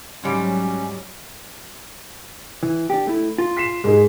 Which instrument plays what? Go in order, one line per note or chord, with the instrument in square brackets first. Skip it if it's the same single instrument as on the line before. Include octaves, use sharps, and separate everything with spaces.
[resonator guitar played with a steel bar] G#2 G3 [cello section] F#3 [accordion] C#4
[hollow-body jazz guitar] E3
D4 G4
A3 E4
F4
[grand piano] B6 C7 E7
[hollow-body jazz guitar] G#2 [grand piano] G#3 D#4 G#4